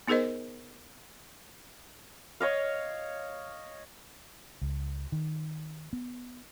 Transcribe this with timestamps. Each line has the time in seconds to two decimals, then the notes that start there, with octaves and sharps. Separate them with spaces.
0.07 B3 D#4 G#4 A#4 C5 D#5
2.40 C#5 D#5 F5
4.62 C#2
5.12 D#3
5.93 B3